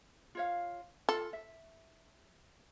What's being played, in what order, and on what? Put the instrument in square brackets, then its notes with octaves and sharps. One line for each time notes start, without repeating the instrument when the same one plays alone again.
[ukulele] F4 C#5 F5
[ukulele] F4 [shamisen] A4
[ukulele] E5